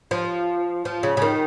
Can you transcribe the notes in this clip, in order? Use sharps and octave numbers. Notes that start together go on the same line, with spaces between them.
F3
F3
C#3
C#3
D#3